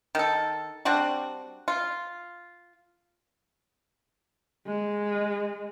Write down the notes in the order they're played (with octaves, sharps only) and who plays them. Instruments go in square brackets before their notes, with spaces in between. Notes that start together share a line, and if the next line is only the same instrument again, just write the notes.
[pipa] D#3 A4
G3 C4 D4 F#4
F4
[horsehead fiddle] G#3